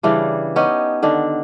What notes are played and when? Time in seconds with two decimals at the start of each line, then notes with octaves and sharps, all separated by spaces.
0.03 C#3 E3 G3 D4
0.56 B3 C#4 D#4 G4
1.03 D3 D#3 D4